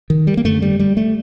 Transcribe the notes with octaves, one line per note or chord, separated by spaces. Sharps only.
D#3
G3
A#3
F#2 D3 A3
G3
G3
A3